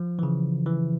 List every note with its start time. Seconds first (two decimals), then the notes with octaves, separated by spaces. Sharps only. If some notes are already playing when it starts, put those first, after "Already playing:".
Already playing: F3
0.19 E3
0.23 C#3
0.66 E3